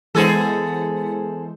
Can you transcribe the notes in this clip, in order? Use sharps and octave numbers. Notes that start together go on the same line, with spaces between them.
E3 G#3 B3 G#4 A4 C5